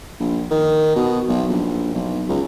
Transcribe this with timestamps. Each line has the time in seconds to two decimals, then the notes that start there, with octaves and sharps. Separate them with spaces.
0.20 A#1
0.51 D#3
0.96 B2
1.29 B1
1.50 A#1
1.94 B1
2.29 C#2